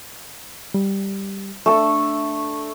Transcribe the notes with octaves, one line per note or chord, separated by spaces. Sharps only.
G3
A3 D4 A4 E6